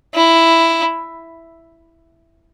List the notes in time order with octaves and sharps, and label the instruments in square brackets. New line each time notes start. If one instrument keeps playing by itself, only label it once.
[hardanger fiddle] E4